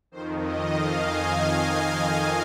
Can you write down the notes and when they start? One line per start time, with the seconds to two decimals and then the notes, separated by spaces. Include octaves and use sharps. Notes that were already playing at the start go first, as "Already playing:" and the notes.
0.11 F2 D#3 C5
0.41 D#5
0.72 F5
1.02 G#5